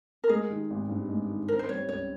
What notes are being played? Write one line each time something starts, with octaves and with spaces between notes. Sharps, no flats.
A#4
G#3 G#4
D#3
G#1
G2
G#3
D#3
C4 A#4
C5
G3 C#5
C#2 C#5